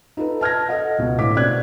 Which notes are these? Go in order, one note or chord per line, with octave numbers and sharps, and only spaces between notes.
D#4 F4 A4 B4
A5 F6 G#6 A#6
A4 D#5 F#5
C#2 B2
A2 D3 D6 B6
B2 C4 D5 F#6 G#6